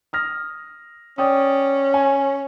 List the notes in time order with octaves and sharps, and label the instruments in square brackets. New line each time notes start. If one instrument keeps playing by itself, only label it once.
[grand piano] D#6 F6 A#6
[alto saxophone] C#4 [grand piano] D5 G5 D#6
[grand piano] G#5